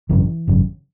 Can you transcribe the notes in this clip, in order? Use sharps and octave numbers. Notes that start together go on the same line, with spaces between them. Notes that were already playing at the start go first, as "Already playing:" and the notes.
G#1 F#2 C#3 E3
G#1 F#2 C#3